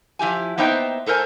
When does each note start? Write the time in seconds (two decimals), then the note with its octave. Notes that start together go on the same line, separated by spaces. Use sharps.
0.19 F3 E4 G4 G#5
0.58 A#3 B3 D#4 C5 E5 G5
1.06 A3 A4 A#4 C5 G#5